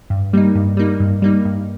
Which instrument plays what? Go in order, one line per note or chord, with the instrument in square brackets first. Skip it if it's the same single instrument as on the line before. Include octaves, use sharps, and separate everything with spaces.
[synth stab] G2
G3 A#3 D#4
G2
G3 A#3 D#4
G2
G3 A#3 D#4
G2